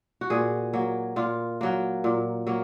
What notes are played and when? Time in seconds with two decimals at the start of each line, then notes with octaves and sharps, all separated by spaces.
0.21 F#4
0.30 A#2 G#4
0.73 F#3 A#3
1.16 A#2 F4
1.61 F#3 A#3
2.04 A#2
2.47 F#3 A#3